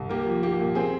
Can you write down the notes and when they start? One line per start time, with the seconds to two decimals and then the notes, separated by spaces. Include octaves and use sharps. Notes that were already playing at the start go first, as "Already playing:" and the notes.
Already playing: C2
0.09 A#3 G4 A#4
0.26 F3
0.43 A#3 G4
0.60 A#2
0.75 C4 G#4